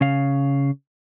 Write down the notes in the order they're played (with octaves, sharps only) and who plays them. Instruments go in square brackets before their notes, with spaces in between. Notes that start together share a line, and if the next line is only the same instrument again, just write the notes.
[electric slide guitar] C#3 F5